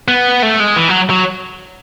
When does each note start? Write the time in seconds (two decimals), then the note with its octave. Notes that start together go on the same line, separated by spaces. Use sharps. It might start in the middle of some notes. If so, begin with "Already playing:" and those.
0.08 B3
0.43 A3
0.60 G#3
0.76 E3
0.88 F#3
1.10 F#3